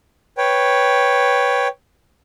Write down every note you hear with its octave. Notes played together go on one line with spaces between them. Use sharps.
B4 C#5 G5